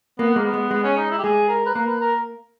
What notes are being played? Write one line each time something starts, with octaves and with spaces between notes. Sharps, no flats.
A#3 B3
G#3 A#3
B3
G#3
G#3 B3
C#4
D#4
E4
G4
G#3 G#4
A#4
B4
A#3 A#4
B4
A#4